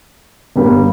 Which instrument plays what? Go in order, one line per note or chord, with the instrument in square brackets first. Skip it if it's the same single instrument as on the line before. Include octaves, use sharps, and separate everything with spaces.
[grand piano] G1 G2 G3 A#3 G4